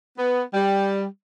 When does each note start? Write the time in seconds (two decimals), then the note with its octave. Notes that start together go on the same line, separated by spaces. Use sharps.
0.17 B3
0.54 G3